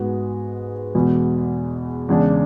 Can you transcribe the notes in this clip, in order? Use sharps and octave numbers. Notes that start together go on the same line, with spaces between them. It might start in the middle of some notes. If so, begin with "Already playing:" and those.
Already playing: G#2 G#3 B3 F#4
E2 B2 G#3
E2 C#3 G#3 D4